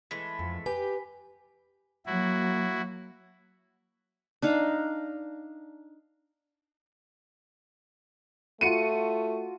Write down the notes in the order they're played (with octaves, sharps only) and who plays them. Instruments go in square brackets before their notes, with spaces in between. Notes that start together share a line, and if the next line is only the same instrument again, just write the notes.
[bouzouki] E3 G#3 A3 [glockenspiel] B6
[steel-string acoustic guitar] F2
[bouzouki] G4 [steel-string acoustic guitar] B4 [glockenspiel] G#5
[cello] F#3 A#3 [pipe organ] E4 F#4
[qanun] D4 D#4 F5
[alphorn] A3 [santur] F4 F#4 D6 [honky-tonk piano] C#7 D#7